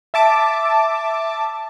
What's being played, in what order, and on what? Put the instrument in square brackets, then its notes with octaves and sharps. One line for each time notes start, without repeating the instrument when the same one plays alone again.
[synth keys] E5 A5 D6